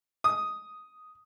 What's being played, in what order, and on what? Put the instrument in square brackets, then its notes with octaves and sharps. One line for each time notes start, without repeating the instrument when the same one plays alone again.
[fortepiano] D#6